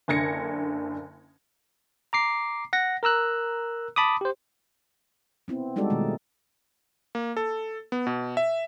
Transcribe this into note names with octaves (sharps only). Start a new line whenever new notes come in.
F#1 D3 G#6 A#6 C#7
A#5 D6 C7
F#5 A#6
A#4 A#5 E6 F#6
A5 B5 D6 D#6
G4 C5
B3 C4 E4
G3 G#3 D#4 F#4 A4 D5
B2 D#3 G#3 A3
A#3
A4
B3
B2
E5